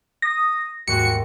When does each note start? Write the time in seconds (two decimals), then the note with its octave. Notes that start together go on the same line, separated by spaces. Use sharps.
0.22 D#6 A#6
0.88 D#2 G#2 A3 F#4 C#7